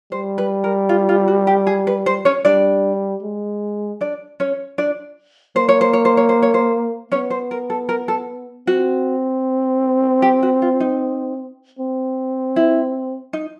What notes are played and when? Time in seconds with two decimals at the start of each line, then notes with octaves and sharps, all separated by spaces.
0.12 G3 C5
0.38 B4
0.64 A#4
0.89 F4
1.09 F4
1.28 F#4
1.47 G4
1.67 G#4
1.87 B4
2.06 C5
2.25 C#4 C#5
2.45 G3 D4 D5
3.23 G#3
4.01 D4 D5
4.40 C#4 C#5
4.78 D4 D5
5.56 A#3 C5
5.69 C#5
5.81 C5
5.93 C#5
6.05 C5
6.17 C#5
6.29 C5
6.42 C#5
6.54 C5
7.11 B3 C#4 C#5
7.30 C5
7.51 A#4
7.70 A4
7.89 A#4
8.08 A4
8.67 C4 F#4
10.22 G4
10.43 F#4
10.62 F4
10.80 D#4
11.79 C4
12.56 E4
13.33 D#4